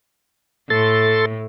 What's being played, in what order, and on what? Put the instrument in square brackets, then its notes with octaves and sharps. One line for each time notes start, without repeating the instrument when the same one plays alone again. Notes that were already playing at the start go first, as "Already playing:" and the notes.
[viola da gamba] A2 [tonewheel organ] A4 C6 A6